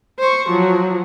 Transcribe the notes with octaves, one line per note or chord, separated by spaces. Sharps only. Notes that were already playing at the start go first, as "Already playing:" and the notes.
C5 C#6
F3 F#3